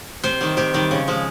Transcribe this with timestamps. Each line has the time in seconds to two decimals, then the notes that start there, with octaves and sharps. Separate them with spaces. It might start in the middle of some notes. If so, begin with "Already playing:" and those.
0.24 C3 C5
0.41 D#3 G3
0.57 C3 G4
0.74 D#3 G3
0.91 C#3
1.08 F3 G#3